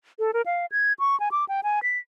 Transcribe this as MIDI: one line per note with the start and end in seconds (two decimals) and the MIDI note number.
0.19 0.31 69
0.34 0.42 70
0.46 0.66 77
0.72 0.93 92
0.99 1.18 85
1.20 1.29 80
1.32 1.45 86
1.49 1.61 79
1.63 1.80 80
1.83 1.98 95